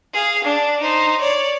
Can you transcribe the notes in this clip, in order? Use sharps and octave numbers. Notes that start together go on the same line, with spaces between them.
G#4 F5
D4
D#4 C5
C#5 D5